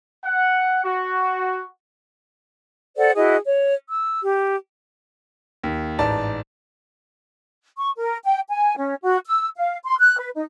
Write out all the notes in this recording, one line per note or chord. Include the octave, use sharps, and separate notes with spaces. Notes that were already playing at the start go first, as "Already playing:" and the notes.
F#5
F#4
A4 C5 D5 F#5
E4 F#4 G#4 D#5
C#5
E6
G4
D#2
A1 G#2 D5 A5
C#6
A#4
G5
G#5
C#4
F#4
E6
F5
C6
F#6
B4
D#4